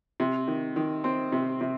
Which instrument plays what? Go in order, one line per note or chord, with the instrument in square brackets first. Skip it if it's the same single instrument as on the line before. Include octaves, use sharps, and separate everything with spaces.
[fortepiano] C3
D#3
D#3
C4
C3
C3